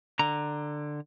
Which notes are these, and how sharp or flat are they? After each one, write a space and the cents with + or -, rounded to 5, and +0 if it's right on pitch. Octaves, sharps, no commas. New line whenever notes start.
D3 +15 A#5 +0